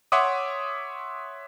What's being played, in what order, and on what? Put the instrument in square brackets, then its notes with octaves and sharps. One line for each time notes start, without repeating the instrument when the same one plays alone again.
[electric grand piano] C#5 E5 F#5 C6 D6 D#6